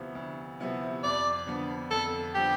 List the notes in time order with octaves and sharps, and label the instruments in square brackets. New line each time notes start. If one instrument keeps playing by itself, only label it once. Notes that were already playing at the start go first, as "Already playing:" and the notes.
Already playing: [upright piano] D2 C3 F3 B3 E4
D2
C3 F3 B3 E4
[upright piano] F2 [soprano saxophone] D5
[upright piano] D3 F3 B3
[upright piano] F2 [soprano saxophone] A4
[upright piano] D3 F3 B3 [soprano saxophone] G4